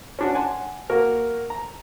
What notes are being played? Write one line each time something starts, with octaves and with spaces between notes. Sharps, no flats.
C#4 D4 F#4
F#5 G#5 A5 C6
A#3 F#4 A#4
A#5